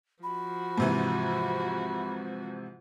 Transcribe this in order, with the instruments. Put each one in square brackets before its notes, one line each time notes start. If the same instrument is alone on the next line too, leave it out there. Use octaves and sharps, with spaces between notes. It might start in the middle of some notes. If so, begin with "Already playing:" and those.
[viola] F3 F#4 [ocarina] B5
[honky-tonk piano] G#2 C3 E3